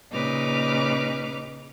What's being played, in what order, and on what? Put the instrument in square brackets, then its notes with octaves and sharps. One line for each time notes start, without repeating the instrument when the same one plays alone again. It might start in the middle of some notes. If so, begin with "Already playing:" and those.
[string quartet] A#2 C#3 D#4 B4 D6 F6